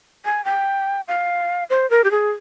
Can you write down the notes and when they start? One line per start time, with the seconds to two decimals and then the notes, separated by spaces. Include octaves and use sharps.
0.25 G#5
0.45 G5
1.08 F5
1.70 C5
1.90 A#4
2.04 G4
2.11 G#4